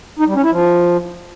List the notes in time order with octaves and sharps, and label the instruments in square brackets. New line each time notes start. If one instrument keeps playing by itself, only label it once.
[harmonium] D#4
G3
C#4
E4
F3